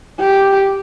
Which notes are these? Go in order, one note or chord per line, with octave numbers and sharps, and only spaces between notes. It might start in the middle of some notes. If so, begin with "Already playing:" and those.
G4